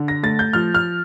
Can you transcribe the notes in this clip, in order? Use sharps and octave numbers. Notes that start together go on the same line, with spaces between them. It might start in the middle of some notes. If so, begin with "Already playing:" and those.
Already playing: D3
A#6
A3 A6
G6
F3 F6
F6